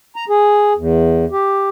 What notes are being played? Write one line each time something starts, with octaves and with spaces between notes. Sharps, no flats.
A#5
G#4
E2
G4